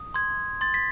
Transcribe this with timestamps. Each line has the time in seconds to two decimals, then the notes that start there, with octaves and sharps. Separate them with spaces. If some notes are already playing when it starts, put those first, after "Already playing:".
Already playing: D#6
0.14 C6 G#6
0.61 C6 A6
0.74 B6